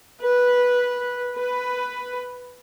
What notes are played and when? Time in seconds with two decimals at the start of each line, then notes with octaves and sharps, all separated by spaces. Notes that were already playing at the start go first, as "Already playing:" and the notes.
0.22 B4
1.39 B4